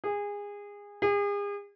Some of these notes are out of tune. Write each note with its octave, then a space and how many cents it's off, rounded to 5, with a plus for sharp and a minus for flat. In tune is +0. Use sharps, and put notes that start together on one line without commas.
G#4 -25
G#4 -40